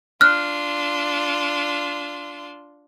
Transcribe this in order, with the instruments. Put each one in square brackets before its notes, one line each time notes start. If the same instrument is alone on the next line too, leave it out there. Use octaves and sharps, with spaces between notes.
[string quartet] D4 F4 C6 [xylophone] F6 F#6